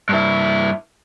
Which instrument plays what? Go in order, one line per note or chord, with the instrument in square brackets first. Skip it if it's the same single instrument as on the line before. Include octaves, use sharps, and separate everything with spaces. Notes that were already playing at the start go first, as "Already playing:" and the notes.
[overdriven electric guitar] G2 E4